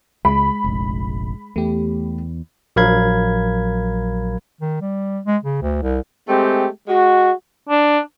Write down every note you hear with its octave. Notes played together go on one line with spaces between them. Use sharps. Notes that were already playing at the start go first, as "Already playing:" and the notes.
C#2 G#3 B5
F1 A#1
E2 A3 G4
A#1 F#3 A#4 F5 B5 G#6
D#3
G3
G#3
C#3
D2
C2
G#3 A3 C4 G4
G#3 F#4
D4